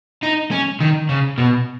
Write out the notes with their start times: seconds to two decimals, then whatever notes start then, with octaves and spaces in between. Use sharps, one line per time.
0.23 D#4
0.51 C#4
0.80 D#3
1.09 C#3
1.38 B2